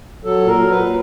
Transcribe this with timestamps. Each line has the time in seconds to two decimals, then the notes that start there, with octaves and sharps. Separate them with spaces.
0.24 F#3 A4
0.41 A#2
0.47 A#4
0.59 F#3
0.70 B4
0.76 A#2